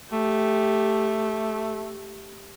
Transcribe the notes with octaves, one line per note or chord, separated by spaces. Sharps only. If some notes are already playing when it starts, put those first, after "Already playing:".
A3 G4